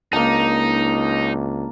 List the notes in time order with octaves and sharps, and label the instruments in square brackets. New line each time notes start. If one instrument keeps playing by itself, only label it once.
[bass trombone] C#2 [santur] A#3 D4 A5 [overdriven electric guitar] D#4